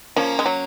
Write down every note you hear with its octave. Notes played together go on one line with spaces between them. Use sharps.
F3 A#3 C#4
G#3
F#3